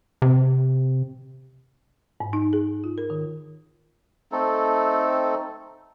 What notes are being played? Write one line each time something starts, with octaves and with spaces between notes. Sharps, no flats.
C3
G#2
D#4
G#4
F4
A#4
D#3
A3 C4 D#4 A4